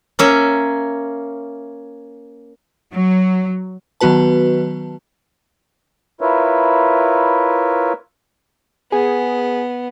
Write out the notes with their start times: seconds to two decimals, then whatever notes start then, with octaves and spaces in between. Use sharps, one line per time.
0.19 A#3 C#4 E5
2.95 F#3
4.01 D#3 F#3 B3 F#4 B4 A5
6.21 E4 F4 A#4 B4 C#5 E5
8.92 B3 G#4